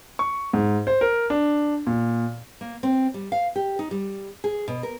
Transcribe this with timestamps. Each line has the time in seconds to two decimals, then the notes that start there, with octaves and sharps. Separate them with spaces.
0.19 C#6
0.53 G#2
0.87 C5
1.01 A#4
1.30 D4
1.87 A#2
2.61 A#3
2.83 C4
3.14 G3
3.32 F5
3.56 G4
3.79 D#4
3.91 G3
4.44 G#4
4.68 B2
4.83 A#4